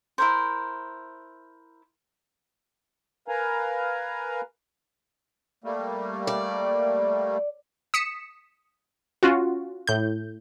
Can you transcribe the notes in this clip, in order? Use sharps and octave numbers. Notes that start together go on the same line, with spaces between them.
E4 A#4 C5
A#4 B4 F5 G#5 A#5
G3 A3 A#3
D5
D#6 B6 C#7 E7
C#4 F4 F#4
A2 G6